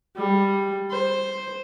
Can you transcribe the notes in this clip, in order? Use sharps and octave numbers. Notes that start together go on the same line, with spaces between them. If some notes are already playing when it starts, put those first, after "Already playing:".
G3
C5